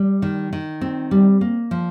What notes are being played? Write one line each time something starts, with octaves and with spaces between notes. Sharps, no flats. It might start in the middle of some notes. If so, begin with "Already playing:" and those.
Already playing: G3
D#3
D#3
C4
G3
A#3
F3